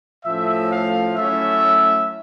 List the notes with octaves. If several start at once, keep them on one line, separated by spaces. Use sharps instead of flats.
A2 F3 A3 C#4 E5
F5
F#3 A3 C#4 E4 E5